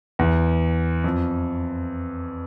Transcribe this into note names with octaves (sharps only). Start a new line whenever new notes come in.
E2
F2